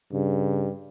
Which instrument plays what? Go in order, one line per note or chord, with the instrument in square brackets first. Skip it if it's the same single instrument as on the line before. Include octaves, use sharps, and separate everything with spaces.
[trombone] G2 [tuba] C#3